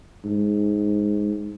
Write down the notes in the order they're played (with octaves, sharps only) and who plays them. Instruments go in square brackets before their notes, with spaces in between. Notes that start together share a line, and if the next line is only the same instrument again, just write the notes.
[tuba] G#2